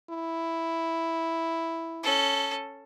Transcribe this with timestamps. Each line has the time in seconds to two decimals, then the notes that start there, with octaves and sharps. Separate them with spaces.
0.10 E4
2.03 C#4 A4